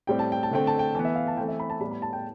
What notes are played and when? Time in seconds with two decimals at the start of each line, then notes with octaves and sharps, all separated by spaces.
0.07 A2 G3 C4 G5
0.19 A5
0.32 G5
0.43 A5
0.51 D3 A3 C4 G5
0.67 A5
0.79 G5
0.95 E3 B3
1.05 E5
1.15 F5
1.27 A5
1.37 E3 A3 C4 G5
1.48 E5
1.60 B5
1.70 A5
1.80 A2 G3 B3 B5
1.91 B5
2.02 A5
2.13 G5